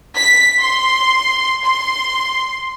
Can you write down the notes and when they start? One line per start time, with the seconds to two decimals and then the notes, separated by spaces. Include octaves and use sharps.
0.16 B6
0.60 C6
1.64 C6